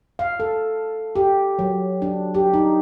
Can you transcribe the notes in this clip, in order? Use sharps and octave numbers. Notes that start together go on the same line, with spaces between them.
F5
A4
G4
F#3
D4
G4
D#4